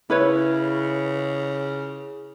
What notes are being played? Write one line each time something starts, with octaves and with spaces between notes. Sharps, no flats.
C#3 E4 B4 C#5